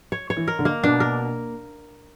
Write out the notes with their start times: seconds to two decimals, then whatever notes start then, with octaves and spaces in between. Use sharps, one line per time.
0.12 C#5
0.30 C#5
0.37 E3
0.48 A#4
0.59 D3
0.65 A#3
0.83 B2 D4
1.00 A#4